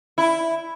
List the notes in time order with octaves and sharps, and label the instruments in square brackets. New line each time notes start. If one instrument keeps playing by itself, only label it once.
[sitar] E4